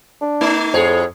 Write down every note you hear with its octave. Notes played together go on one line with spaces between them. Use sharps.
D4
A3 D#4
F2 A2 G#4 C#5